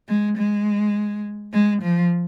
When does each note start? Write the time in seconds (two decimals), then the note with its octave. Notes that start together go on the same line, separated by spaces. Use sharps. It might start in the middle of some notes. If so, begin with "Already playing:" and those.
0.08 G#3
0.37 G#3
1.53 G#3
1.82 F3